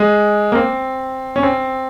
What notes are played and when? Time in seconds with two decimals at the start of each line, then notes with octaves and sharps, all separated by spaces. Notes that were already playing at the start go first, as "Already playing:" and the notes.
Already playing: G#3
0.52 A#3
0.55 C4
1.36 C#4
1.43 C4